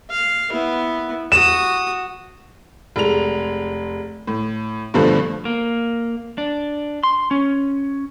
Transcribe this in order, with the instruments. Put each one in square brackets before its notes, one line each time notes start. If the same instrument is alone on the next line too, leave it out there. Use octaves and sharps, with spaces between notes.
[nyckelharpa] F5
B3 E4
[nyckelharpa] F#4 D#6 [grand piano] E7
[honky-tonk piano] F1 G#3 F7
A2
G2 B2 D3 F3 A3
[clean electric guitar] A#3
D4
C6
C#4